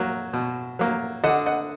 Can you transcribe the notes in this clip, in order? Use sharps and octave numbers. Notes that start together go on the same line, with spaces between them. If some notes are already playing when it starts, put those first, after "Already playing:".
Already playing: F#3 A#3
B2
F#3 A#3
D3 D#5 F#5
D#5 F#5